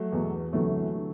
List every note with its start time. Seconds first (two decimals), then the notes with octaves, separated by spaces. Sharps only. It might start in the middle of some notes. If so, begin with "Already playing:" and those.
Already playing: F#3 A3
0.12 E2 B2
0.53 D2 C3 E3 F#3 A3
0.96 D3